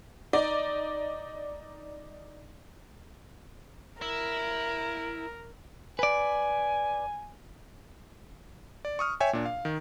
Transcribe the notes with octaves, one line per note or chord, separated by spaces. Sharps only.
D#4 D5
E4 A#4
B4 D5 G#5
D5
C#6 D#6 F6
C#5 E5 G5 G#5
A#2 D4
F5
D#3